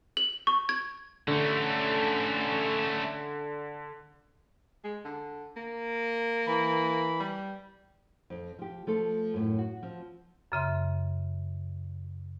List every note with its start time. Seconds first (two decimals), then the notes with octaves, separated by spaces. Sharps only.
0.17 F#7
0.47 C#6
0.69 G#6
1.28 D3 A3 C#4
4.84 G#3
5.05 D3
5.57 A#3
6.47 E3 B5
7.20 G3
8.30 F2
8.59 F3 G4
8.87 F3 A3 A4
9.34 F#2 A2
9.59 F#4
9.83 F3 C4
10.52 F#2 C#3 E5 C6